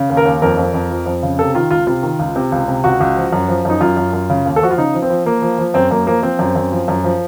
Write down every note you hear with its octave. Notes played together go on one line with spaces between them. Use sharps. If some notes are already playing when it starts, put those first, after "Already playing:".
Already playing: C#3
D#2
A#4
D#2
F2 A#4
F2
F2
F3
F2
C#3
C3 A4
D#3 F4
C#2 F4
C3 F4
D#3
C#2
C3
C#2
C3
C#2 F#4
C#2
F3
F#2
F3
F#2 D#4
F#2 F4
F#2
F#2
C#3
D#2
A4
F3 F#4
F4
C#3 D#4
F3
C4
F3
F3 A#3
F3
F3
F#2 C4
F#2 A#3
F3 A#3
F3 C4
F#2
F#2
F3
F#2
F3